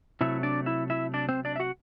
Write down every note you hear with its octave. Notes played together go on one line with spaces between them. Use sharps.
C3 F#3 A3 E4 E5
D4 D5
E4 E5
E4 E5
D4 D5
C4 C5
D4 D5
E5
F#4 F#5